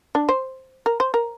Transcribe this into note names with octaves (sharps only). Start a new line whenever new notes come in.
D4
C5
A#4
C5
A#4